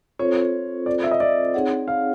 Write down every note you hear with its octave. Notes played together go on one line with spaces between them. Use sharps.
C4 F4 A4 C5 C#5
D5
E5
D#5
D5
C4 D#4 G#4 C#5 F#5
F5